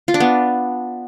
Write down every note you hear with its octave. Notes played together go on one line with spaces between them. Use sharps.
F4
D4
B3